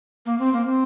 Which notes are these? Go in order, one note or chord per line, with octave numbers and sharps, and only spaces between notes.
A#3
C4
A#3
C4